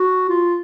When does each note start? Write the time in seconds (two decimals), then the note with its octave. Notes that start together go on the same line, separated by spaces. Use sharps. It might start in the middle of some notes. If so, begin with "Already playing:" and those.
Already playing: F#4
0.29 F4